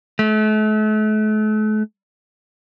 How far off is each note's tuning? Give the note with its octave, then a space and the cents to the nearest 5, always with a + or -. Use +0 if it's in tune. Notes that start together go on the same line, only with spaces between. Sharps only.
A3 -40